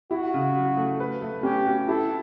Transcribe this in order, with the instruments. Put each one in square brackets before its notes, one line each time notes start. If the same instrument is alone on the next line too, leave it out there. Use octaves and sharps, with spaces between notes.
[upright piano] E4 [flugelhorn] F#4
[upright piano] C#3
F#3
A3
B4
A3
[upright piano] C#4 [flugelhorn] G4
[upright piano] F#4
[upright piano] E4 [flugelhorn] A4